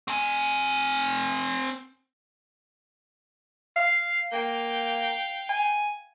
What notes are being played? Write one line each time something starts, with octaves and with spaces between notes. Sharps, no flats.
C4 G#5
F5
A#3 F5 G5
G#5